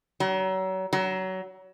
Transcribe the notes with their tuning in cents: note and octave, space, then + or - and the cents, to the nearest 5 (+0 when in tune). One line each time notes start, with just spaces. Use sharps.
F#3 +35
F#3 +25